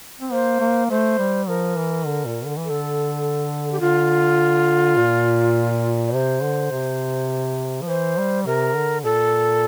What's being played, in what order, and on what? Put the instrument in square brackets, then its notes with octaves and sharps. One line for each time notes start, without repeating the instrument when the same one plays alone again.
[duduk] C4
[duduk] A#3 [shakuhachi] C5
[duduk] A#3
[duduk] A3 [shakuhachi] C5
[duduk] G3
[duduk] F3 [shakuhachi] A#4
[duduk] E3
D3
A#2
D3
E3
[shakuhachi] A4
[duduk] D3
[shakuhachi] G4
[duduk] D3 [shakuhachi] F4
[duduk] A#2
[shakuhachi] D5
[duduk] C3 [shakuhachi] C5
[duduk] D3
C3
F3
[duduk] E3 [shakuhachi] C5
[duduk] G3
[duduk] C3 [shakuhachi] A#4
[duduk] D3
[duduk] A#2 [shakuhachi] A4